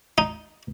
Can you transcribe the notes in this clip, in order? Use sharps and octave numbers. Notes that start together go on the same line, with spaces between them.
D#4